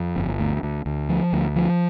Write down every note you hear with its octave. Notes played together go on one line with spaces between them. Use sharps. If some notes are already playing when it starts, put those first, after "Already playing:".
Already playing: F2
G1
D2
D2
D2
F3
D2
F3